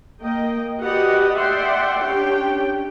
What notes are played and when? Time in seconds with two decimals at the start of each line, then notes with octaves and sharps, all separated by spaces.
0.21 A#3 D#5 G5
0.80 F#4 G4 B4 D5 D#5 F#5
1.36 D5 E5 F#5 G5 C6
1.99 C#4 D4 G4 G5